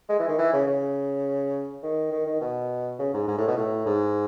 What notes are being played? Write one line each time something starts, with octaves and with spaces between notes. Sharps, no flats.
G#3
E3
D#3
E3
C#3
C#3
D#3
D#3
D#3
B2
C#3
G#2
G#2
A2
B2
A2
G#2